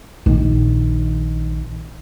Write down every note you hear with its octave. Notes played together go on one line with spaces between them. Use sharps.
A#1 D#3